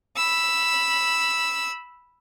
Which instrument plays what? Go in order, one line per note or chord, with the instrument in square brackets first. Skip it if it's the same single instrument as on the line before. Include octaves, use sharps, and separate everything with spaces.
[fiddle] B5 E6